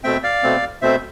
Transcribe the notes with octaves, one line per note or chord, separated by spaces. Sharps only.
B2 A3 C4 E5 G5
D5 F5
B2 A3 C4
B2 A3 C4 C5 E5